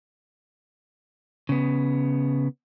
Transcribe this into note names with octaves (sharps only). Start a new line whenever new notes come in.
C#3 B3